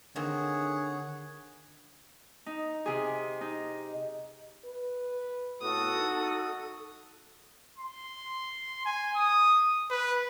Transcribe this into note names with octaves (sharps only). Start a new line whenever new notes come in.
D3 D#3 A#3 C4 G#4 C#5 F#5
D#4
C3 G#4
D#4
B4
A2 F#4 A4 D#6
D#4
C6
G#5
D#6
B4